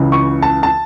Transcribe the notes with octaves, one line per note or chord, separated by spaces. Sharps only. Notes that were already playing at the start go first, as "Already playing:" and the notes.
Already playing: C#2 C#3 E3
C#6
A5
A5